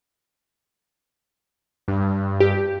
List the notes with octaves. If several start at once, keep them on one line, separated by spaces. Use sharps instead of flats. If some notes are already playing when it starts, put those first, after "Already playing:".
G2
G4